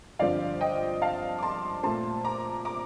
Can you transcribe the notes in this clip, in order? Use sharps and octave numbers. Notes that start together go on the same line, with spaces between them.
G2 D3 F3 C4 D5 F5
D#5 G5
F5 A5
D6
A5 C6
A#2 A3 C4 A5 C6
A#5 D6
A#5 D6